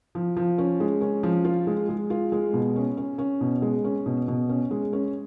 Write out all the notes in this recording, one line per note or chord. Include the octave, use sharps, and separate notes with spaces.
F3
F3
C#4
G#3
C#4
F3
F4
G#3
G#3
F4
G#3
B2
C#4
C#4
C#4
B2
G#3
C#4
B2
B2
C#4
G#3
C#4